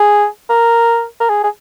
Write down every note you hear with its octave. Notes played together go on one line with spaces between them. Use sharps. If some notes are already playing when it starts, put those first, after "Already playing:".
Already playing: G#4
A#4
A#4
G#4
G#4